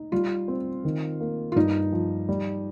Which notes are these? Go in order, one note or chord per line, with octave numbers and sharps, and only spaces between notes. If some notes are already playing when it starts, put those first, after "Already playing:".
Already playing: D#4
G3 F4
C4
D#3
A#3
F4
G2 D#4
F3
G3